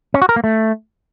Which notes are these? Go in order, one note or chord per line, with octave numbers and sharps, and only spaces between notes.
C#4
F#4
A#4
A#3
A3